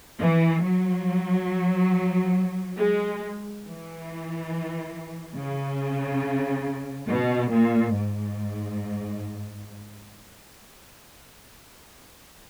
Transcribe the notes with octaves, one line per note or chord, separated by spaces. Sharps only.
E3
F#3
G#3
E3
C#3
B2
A#2
G#2